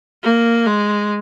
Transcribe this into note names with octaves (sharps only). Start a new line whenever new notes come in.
A#3
G#3